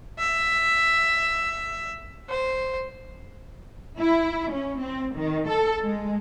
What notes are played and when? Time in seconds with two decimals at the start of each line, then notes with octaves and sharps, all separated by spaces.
0.19 E5
2.30 C5
3.99 E4
4.51 C#4
4.80 C4
5.16 D#3
5.48 A4
5.84 G#3